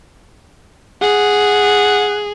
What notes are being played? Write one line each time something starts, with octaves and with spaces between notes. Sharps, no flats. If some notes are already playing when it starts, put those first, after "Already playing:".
G#4 F#5